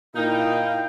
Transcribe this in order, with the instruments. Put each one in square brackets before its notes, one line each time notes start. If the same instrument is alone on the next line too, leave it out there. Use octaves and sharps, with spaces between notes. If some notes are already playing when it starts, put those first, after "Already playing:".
[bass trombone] A#2 [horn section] D#4 [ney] E4 [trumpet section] F5 G5